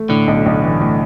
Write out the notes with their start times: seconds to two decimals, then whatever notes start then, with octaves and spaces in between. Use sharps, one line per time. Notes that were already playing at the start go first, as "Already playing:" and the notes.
Already playing: A3
0.09 A2 D3
0.27 B1
0.46 B1
0.63 E3
0.80 A2